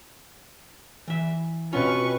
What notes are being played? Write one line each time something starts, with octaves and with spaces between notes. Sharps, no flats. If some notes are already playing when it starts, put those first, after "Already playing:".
E3 E5
B2 C4 C#4 F4 B4 C#6